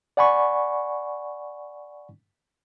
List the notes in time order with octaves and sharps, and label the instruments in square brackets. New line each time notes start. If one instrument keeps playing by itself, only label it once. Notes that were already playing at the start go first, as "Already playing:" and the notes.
[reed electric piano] D5 F#5 G#5 B5 C#6